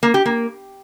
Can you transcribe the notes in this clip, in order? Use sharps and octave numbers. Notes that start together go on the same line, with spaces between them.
A#3
G4
A#3